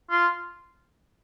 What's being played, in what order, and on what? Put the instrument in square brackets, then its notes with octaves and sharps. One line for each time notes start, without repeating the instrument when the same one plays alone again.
[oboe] F4